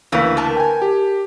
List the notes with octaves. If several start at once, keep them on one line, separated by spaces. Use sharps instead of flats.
D2 C#3 E3 A#3 B4
A#4 A5
G5 G#5
G4